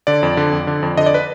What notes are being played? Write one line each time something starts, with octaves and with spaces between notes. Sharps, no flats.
D3 D5
F2
D3
F2
D3
F2
D3 D#5
D5
B4